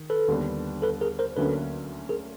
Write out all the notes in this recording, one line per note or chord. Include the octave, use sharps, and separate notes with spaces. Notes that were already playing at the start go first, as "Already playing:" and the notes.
Already playing: D#3
A4 B4
D#2 D3 G3 B3 D4
A4 B4
G#4 A#4
A#4 C5
D2 D3 F#3 A#3 C#4 A4 B4
G#4 A#4